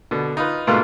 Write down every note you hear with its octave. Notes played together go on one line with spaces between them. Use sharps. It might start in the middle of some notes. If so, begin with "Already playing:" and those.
B2 D3
D#4 F4 B4
G#2 B2 A3 A#3 F4 B4